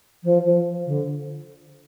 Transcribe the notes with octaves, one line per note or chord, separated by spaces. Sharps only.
F3
F3
D3